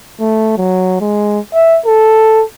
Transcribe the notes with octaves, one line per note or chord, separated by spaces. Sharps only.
A3
F#3
G#3
E5
A4